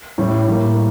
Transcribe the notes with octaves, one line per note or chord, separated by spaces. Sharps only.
A2 G3 C#4
A2 G3 A#3